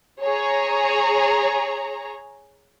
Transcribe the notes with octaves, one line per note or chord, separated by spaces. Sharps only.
G#4 C#5 A#5